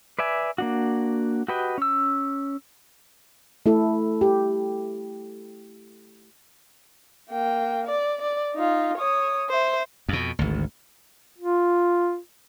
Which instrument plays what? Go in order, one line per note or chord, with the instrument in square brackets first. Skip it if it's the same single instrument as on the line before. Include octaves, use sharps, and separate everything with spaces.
[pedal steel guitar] B4 D5 E5 G#5
A#3 D4 F#4
F#4 G4 B4 D#5 G5
C#4 E6
[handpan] A3 E4 A4
G4
[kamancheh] A#3 G5
D5
D5
D#4 F4
C#5 D#6
C5 E5
[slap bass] F2 B2
G#1 D2
[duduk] F4